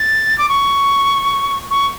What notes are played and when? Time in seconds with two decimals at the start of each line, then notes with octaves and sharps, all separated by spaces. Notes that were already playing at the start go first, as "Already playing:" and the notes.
Already playing: A6
0.38 D6
0.49 C#6
1.71 C#6